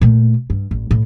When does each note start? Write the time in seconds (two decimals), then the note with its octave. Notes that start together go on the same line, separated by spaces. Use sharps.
0.01 A#2 A3
0.50 G2
0.71 A1
0.91 A2